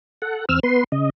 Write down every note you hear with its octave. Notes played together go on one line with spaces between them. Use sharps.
A4 F#5
E2 C4 E6 F6
B3 B4 C6
C#3 D#5